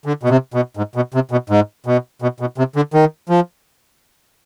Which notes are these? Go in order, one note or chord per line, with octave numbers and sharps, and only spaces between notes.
D3
B2
C3
B2
G#2
B2
C3
B2
G#2
B2
B2
B2
C3
D3
D#3
F3